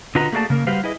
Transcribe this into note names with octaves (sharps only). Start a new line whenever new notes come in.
D3 F4 F#4 B4 D#5 A#5
A3 A#3 F#4 G#4 D5 A5
C#3 A#3 A#4
G3 F#4 G4 B4 C5 F5
E4 G#4 B4 D#5